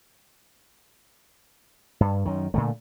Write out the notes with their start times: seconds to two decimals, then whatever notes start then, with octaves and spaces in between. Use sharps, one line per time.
2.01 G2
2.25 F#2 D#3
2.54 A#2 D3 A3